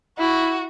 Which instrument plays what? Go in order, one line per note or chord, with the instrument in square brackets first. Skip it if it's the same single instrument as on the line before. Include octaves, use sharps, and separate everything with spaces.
[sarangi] E4 [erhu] F#4